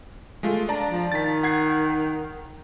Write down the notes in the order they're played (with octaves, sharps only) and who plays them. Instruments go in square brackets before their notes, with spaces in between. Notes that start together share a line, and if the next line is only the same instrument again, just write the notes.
[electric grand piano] G#3 A3 F4
[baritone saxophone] D4 [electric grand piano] D5 A5 A#5
[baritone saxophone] F3
[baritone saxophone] D#3 [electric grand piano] A6 B6
[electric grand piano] F#5 G#6 C7